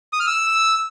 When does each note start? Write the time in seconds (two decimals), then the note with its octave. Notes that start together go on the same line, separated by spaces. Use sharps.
0.13 D#6
0.20 F6
0.27 E6